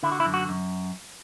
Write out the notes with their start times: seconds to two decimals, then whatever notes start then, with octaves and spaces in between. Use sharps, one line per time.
0.03 D3 E4
0.12 F#4
0.20 E4
0.26 F#2
0.34 F#4
0.49 F#2